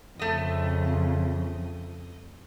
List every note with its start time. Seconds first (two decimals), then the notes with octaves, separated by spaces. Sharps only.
0.19 F2 C#3 A3 D#5